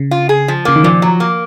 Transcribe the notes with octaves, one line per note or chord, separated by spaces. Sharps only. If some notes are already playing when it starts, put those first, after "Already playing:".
Already playing: C#3
F4
G#4
F3
C#3 A#3
D#3
A#2 F3
F#3
A#3